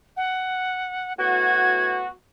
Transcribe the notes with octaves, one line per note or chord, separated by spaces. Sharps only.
F#5
A2 B3 F#4 G#6